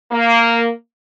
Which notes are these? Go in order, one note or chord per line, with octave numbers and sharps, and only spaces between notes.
A#3